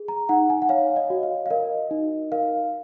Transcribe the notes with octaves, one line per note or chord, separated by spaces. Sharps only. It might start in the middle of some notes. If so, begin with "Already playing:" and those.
Already playing: G#4
A#5
D#4 F#5
G#5
F#5
C#5 F5
D#5
F#4
F5
F5
A#4 D#5
D#4
A#4 F5